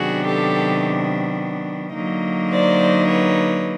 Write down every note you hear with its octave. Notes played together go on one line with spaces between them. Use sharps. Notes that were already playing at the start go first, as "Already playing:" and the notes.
Already playing: C3 D#3 F#3 B3 D4 F#4 G#4
G4 A4
D3 F#3 A#3 D#4
C5 D5
B4 C#5